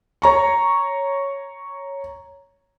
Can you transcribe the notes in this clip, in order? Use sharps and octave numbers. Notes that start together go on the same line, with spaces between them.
C#5 A#5 C#6